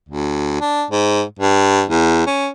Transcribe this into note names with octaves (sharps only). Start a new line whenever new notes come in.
D2
D4
G#2
G2
E2
C#4